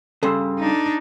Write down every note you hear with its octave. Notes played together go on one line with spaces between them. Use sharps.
G2 C#3 A4 C6 E6
D4 D#4